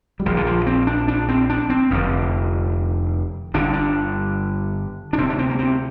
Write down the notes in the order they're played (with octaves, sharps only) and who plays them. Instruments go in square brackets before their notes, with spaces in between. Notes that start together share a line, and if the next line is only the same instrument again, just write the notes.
[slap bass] G3
A#1 A#2 F3
D3
F3
C4
D4
D4
C4
D4
C4
F1 F2 D3
G1 G2 D3 D4
D4
D4
D2 C3 C4
D4
C4
A#3
C4